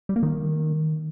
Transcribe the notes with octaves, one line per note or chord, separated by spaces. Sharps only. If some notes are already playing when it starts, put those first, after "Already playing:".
G3
A#3
D#3